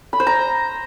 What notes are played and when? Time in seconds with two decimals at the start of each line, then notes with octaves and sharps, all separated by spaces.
0.13 B5
0.20 C5
0.27 A#5